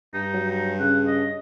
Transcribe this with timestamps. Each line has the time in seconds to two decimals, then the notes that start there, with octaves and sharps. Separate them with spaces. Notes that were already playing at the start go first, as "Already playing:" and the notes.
0.14 G2 D#4
0.33 F#3
0.50 D#4
0.80 C#3 F#5
1.07 D#5